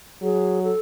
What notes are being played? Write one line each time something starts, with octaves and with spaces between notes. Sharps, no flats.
F#3 G#4
A4